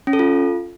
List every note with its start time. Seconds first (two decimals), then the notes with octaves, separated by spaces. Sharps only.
0.07 C#4
0.13 A4
0.19 F4